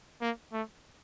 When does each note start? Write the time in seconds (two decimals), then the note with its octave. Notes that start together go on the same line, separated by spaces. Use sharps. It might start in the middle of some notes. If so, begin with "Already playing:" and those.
0.21 A#3
0.52 A3